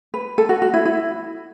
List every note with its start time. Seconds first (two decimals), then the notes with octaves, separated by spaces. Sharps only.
0.14 B4
0.38 A4
0.49 F#4
0.62 F#4
0.74 E4
0.85 E4